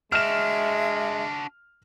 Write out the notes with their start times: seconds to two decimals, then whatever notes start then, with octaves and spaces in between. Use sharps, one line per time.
0.12 G#3 D4 F#4 E5 F6 E7